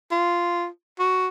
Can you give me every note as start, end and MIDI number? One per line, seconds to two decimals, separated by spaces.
0.11 0.67 65
0.99 1.28 66